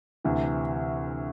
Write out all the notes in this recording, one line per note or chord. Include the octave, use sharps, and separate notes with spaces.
D2 C3 E3